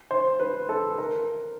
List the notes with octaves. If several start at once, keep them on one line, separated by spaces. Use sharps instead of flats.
C5
B4
A4
A#4